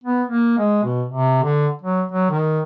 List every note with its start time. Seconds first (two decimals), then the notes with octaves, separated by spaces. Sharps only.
0.04 B3
0.28 A#3
0.58 G#3
0.84 B2
1.07 C3
1.43 D3
1.82 F#3
2.12 F#3
2.30 D#3